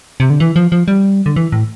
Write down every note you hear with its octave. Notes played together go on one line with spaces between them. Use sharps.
C3
D3
E3
F3
F3
G3
D3
E3
A2